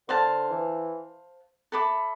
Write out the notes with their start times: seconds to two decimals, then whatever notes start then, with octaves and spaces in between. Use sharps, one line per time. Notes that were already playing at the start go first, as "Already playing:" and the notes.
0.08 D3 C5 F5 A5
0.50 E3
1.72 A4 E5 B5 D6